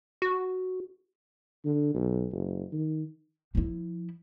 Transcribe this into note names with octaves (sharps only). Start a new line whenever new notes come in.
F#4
D3
B1
F#1
D#3
F3 E4